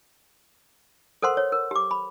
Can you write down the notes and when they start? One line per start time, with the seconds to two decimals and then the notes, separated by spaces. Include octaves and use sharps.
1.22 A4 A#4 C5 F#5 C6
1.37 C#5
1.52 A#4
1.71 G4 D6
1.91 B5